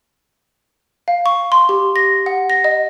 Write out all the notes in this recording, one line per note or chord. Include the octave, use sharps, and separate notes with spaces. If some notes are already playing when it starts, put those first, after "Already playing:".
F5
C#6
C6
G4
A#6
F#5
A#6
D#5